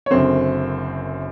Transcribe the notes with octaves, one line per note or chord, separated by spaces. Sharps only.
C#5
F#1 F#2 D3 C4 C5